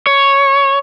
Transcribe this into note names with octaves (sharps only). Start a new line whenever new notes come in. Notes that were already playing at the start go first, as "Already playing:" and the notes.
C#5